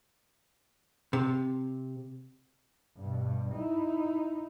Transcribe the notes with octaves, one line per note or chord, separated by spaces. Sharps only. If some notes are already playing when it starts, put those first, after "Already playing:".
C3
G2 B2
D#4 E4